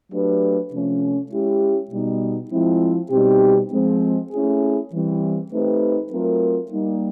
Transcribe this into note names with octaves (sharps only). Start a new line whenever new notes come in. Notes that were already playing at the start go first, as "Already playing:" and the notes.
F#3 A3 D4 G4 B4
C3 F3 A3 C#4
G#3 C#4 E4 G4
B2 G3 B3 D#4
F3 G#3 C4 E4
B2 G3 C4 D#4 G4
F3 G#3 C4
A3 C#4 E4 G#4
E3 G3 C4
A3 C4 D#4 G4 B4
F#3 A3 C4 F4 A#4
G3 A#3 D#4